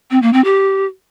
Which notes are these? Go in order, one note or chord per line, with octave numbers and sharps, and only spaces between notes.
C4
A#3
C4
G4